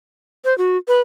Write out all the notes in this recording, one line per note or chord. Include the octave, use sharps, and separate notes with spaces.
C5
F#4
B4